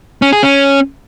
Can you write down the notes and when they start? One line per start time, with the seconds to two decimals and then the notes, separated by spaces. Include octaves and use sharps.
0.22 C#4
0.32 G#4
0.43 C#4